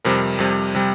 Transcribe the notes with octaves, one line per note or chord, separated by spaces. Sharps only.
F2 C3 G3 A#4
F2 C3 G3
C3 G3